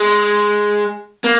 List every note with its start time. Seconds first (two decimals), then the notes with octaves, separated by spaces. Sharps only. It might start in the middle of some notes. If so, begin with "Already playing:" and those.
Already playing: G#3
1.24 A#3